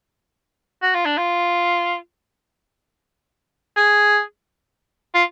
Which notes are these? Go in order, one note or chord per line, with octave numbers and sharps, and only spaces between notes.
F#4
F4
D4
F4
G#4
F4